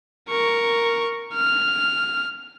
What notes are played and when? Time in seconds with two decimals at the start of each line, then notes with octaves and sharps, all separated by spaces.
0.29 A#4 C#6
1.34 F6